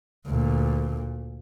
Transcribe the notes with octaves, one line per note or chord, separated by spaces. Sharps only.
D2 A#2